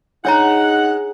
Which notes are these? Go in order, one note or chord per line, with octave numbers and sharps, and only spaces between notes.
G#3 D4 D#4 C#5 F#5 A#5